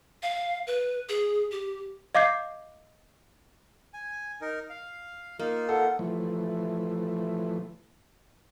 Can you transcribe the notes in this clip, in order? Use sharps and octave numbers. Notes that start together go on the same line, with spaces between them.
F5
B4
G#4
G4
D#5 F5 D6 G6 C7
G#5
D#4 A#4
F5
A#3 D#4 F4
A4 F#5
E3 F3 A3